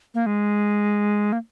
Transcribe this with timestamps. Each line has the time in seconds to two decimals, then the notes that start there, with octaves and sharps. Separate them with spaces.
0.14 A#3
0.26 G#3
1.32 A#3